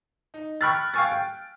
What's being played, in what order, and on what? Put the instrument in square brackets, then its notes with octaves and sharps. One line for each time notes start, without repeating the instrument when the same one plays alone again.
[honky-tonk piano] D#4
G5 B5 C#6 F6 F#6 A6
F5 G5 G#5 C#6 A6
G5